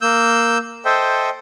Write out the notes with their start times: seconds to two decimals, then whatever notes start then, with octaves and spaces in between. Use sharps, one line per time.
0.01 A#3 E6 G6
0.85 A4 C5 D#5 E5 G5